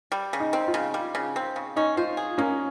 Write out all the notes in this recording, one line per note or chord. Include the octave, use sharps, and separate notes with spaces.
G3
C#3
D#4
C4
F4
C#3
G3
C#3
C4
C#3
C#4 D#4
F4 C5
G#4
A#3 C#4